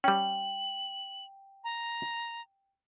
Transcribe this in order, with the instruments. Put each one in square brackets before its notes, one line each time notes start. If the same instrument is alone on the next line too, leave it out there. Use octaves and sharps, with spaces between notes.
[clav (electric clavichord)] G3 C#4 [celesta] G5 [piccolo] F#7
[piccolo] A#5